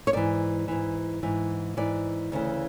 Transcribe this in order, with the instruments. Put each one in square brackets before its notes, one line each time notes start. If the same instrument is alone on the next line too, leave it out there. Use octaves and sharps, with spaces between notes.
[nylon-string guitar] C#5
G#2 E3 D5
G#2 E3
G#2 E3
G#2 E3 D5
D2 C#3 E3